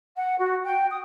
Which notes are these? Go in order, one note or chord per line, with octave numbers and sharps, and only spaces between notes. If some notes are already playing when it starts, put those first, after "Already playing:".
F#5
F#4
G5
D#6